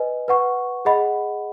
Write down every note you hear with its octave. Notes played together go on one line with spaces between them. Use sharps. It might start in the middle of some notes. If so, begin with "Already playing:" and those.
Already playing: B4 D#5 G#5
B4 F#5 C#6
G#4 D#5 F#5 B5